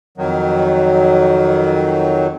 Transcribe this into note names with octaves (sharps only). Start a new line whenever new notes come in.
F2 D#3 F#3